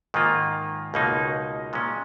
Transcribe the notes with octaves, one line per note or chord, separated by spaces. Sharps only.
G#2 D#3 A#3 F4
C#2 B2 A#3 D#4
A#2 G#3 C#4